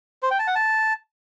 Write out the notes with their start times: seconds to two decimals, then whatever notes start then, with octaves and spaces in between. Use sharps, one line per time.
0.23 C5
0.31 G5
0.39 A5
0.47 F#5
0.55 A5